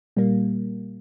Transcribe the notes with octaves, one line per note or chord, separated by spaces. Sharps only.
A#2 G3 A#3